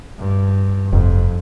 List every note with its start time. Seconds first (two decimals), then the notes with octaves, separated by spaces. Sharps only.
0.19 G2
0.93 F1 F2